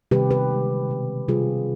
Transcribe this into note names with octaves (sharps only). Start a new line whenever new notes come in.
C3 D#3 G3 G4 B4
G4 B4
D3 G#3
B2 G3
C3 G3 F4 G#4